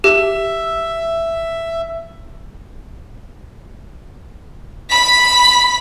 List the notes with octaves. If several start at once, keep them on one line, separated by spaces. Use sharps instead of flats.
G4 E5
B5 B6